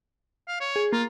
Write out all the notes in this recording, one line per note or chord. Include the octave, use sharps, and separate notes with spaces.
F5
C#5
G#4
A#3 F4